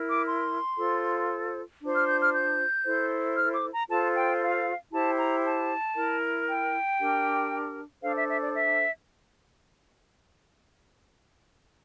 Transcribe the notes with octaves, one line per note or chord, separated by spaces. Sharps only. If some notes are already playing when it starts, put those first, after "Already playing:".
Already playing: E4 A#4
D6
C6
F4 A4 C5
D4 F4 C5
F6
G6
F6
G6
E4 A4 C5
F6
D6
A#5
F4 A4 C5 A5
G5
F5
E4 G4 C5 A5
A#5
A5
E4 A#4
G5
D4 G4 A#4
D4 A4 C5 F5
E5
E5
D5
E5